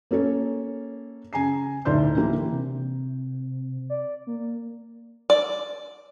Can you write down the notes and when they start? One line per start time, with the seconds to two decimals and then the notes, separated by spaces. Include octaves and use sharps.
0.11 A#3 C#4 A4 C#5
1.33 C#3 G#5 A#5 C7
1.85 D2 A2 D#4 D5 C6 G6
2.16 D3 E3 A#3 E4 G4
2.51 C3
3.90 D5
4.27 A#3
5.30 D5